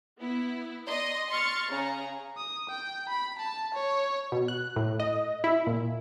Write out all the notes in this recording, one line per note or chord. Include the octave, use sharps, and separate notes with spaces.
B3 E4
D5 D#5 C6
C6 C#6 F6 A6 C#7
C#3 G#4 A#5
D#6
G5
B5
A5
C#5
B2
F#6
A2
D#5
E4
A#2